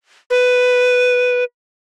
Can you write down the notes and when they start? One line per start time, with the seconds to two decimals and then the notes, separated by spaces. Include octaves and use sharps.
0.30 B4